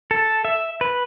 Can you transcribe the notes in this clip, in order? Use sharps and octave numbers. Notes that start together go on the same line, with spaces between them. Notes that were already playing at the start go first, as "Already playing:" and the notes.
A4
E5
B4